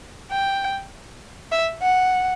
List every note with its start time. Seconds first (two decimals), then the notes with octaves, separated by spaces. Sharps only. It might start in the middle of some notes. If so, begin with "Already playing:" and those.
0.32 G5
1.52 E5
1.82 F#5